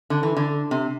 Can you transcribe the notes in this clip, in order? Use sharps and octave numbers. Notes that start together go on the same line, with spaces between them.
D3
E3
D3
C3